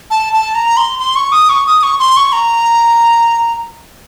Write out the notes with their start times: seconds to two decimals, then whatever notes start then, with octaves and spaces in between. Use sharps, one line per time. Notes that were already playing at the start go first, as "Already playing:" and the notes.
0.11 A5
0.33 A5
0.55 A#5
0.77 C6
0.99 C6
1.16 C#6
1.32 D#6
1.49 C#6
1.67 D#6
1.83 C#6
1.99 C6
2.16 C#6
2.32 A#5